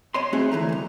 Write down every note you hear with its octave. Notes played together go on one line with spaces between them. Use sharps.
C#5 D#5 C6
A3 C4 D#4 F#4 G#4
D2 E3 A3 A#5
C2 F#2